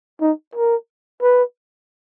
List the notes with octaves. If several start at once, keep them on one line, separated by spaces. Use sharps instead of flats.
D#4
A#4
B4